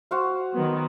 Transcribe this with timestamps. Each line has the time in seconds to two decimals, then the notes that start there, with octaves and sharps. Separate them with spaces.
0.11 F#4 C5 F5
0.53 D#3 F#3 B3